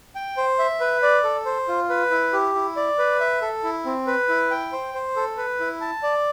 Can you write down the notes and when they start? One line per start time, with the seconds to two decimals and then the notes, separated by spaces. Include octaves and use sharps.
0.15 G5
0.37 C5
0.59 E5
0.80 B4
1.03 D5
1.24 A4
1.45 C5
1.68 F4
1.89 B4
2.11 E4
2.33 G4
2.55 E4
2.76 D5
2.99 B4
3.20 E5
3.42 A4
3.64 E4
3.85 C4
4.07 B4
4.29 E4
4.51 G5
4.72 C5
4.94 C5
5.16 A4
5.38 B4
5.60 E4
5.81 A5
6.03 D5